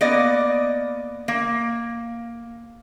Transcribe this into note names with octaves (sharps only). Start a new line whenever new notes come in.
A#3 B3 D5 D#5
A#3